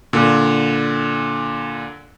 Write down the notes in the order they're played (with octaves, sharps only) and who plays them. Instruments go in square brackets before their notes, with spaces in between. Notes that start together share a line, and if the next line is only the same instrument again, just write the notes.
[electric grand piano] A#2 D3